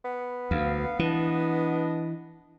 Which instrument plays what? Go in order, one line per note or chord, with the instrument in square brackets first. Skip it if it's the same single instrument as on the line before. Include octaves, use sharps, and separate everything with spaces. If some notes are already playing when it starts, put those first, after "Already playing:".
[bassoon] B3
[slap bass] D2 [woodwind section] F5
[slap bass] E3 [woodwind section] D4 D#5